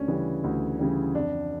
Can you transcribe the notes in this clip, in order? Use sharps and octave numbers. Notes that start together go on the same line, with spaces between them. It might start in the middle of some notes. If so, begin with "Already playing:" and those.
Already playing: D2 C#4 D4
C#3 E3 G3
D2
C#3 E3 G3
F2 D4